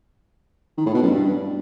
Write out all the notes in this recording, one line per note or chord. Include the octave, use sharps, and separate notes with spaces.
D#3
A2
B2
F#2
G2